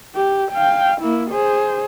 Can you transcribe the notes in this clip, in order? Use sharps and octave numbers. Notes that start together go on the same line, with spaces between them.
G4
F5 G5
A#3 E4
G#4 C5